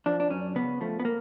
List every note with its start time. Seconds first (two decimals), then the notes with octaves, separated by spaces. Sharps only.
0.06 F3 D4
0.20 D4
0.30 F#2 C#4
0.55 C#3 B3
0.81 F3 A3
1.00 B3
1.05 A#3